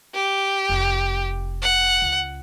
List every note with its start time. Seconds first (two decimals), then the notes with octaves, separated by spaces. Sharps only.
0.15 G4
0.69 F1
1.62 F#5
2.02 C#2